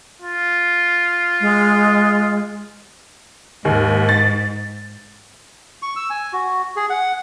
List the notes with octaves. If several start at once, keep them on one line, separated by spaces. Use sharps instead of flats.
F4
G#3
D#2 G#2
A6
C#6
E6
G#5
F#4
G#4
F#5